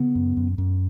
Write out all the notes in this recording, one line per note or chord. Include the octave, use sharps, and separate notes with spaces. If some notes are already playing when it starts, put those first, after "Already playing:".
Already playing: C#3 B3
F#2
F#2
F#2